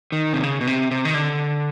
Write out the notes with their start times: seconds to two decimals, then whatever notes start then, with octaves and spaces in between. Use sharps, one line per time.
0.12 D#3
0.33 C3
0.43 C#3
0.61 B2
0.67 C3
0.91 C3
1.05 D#3
1.14 D3